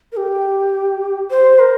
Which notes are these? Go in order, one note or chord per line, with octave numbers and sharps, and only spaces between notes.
A#4
G4
C5
A#4